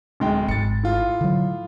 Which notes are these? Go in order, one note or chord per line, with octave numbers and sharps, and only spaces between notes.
D1 G#3 G5
G#1 A6 C#7
A2 F4
D3 F#3